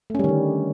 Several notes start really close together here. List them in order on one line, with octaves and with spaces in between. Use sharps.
A3 C#4 G3 D#3 D3